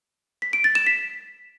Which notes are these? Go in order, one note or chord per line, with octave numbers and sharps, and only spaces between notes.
B6
D7
A6
E7
B6